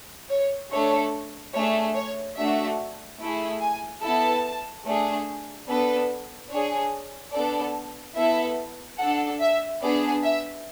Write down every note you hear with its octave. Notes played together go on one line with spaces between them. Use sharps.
C#5
A3 D4 A4 C#5
A3 D4 G#4 C#5
C#5
A3 D4 F#4 E5
A3 E4 G#4
G#5
B3 E4 A4 A5
A3 D4 G#4
B3 D4 A4 B4
D4 G#4 C#5
B3 D4 A4 D5
B3 E4 A4 E5
D4 A4 F#5
E5
B3 D4 G#4 D5
E5